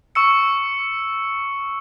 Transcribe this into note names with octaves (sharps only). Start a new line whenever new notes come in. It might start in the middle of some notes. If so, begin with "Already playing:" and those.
C#6 E6 C#7